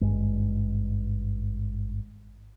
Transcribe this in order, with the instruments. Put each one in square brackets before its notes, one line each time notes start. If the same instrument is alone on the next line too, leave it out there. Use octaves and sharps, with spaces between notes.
[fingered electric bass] G#1 G2 G#3